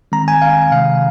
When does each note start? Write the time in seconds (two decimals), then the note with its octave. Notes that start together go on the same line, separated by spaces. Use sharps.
0.12 D#3 G#3 C4 A#5
0.28 G#5
0.42 F5
0.72 C3 D#3 G#3 F5